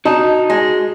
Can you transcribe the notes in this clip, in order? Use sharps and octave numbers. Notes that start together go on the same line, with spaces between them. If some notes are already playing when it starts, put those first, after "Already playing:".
D#4 F#4 A5
G#3